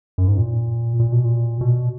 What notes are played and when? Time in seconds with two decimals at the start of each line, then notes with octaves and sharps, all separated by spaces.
0.18 F#2
0.28 G#2
0.38 A#2
1.00 A#2
1.12 B2
1.25 A#2
1.61 B2